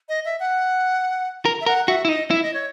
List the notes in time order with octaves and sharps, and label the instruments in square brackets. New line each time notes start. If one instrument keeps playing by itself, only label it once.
[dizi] D#5
E5
F#5
[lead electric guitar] A#4
[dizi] E5
[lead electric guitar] A#4 [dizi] F#5
[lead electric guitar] F#4 [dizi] E5
[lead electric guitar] E4
[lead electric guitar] D#4 [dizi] D#5
[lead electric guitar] E4 [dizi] E5
[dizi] D#5
C#5